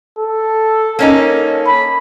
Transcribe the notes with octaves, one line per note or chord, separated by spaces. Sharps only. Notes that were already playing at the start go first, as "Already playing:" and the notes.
A4
A#3 C#4 D#4 A4
B5